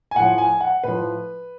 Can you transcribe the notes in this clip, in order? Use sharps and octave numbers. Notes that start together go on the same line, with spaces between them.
G#5
A2 F3 F#5
G#5
F#5
A2 F3 B4